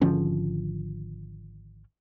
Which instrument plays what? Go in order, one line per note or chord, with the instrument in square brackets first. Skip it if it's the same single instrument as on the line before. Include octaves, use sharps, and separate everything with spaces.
[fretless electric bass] G#1 D3 F3 C#4